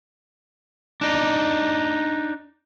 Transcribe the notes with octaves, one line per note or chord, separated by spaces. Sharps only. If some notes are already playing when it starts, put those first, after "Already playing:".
D4 D#4